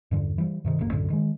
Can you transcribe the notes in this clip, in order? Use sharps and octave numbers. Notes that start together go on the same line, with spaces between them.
E2 G2 D3
E3 G3
G2 C3 D#3
F#1 C2 C3 A#3
C2 F#2 A2 D3
D#3 G#3